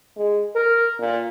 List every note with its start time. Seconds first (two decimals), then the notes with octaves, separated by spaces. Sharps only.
0.17 G#3
0.55 A#4
0.99 A#2